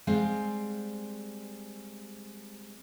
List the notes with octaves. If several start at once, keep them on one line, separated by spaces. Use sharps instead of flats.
G3 G#3 C4 F5